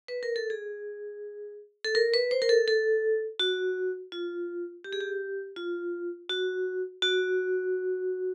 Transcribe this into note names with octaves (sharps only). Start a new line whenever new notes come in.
B4
A#4
A4
G#4
A4
A#4
B4
C5
A#4
A4
A4
F#4
F4
G4
G#4
G4
F4
F#4
F#4